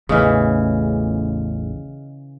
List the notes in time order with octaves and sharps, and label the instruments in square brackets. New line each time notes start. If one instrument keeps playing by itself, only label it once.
[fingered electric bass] A1 E2 A2 [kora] C#3 E3 [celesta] G#4 D#5 F6